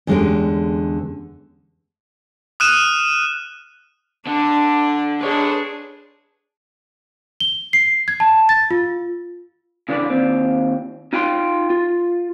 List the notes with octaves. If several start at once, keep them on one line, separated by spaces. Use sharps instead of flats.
E2 D3 G#3 C#4 G4
D#6 F6 F#6 D#7 E7
D3 D4
D4 G#4 B4 C#5
G7
C7
G#6
A5
A6
F4
C#3 E3 D4 B4 D5
D#2 C4
D#4 F4 G5 A#5 C6
F4